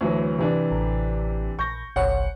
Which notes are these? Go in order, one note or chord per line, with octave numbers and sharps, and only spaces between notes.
D2 E3 F#3
C3 E3 D4
A1
A#1 C#6 G6 A#6
G1 C2 C#5 F#5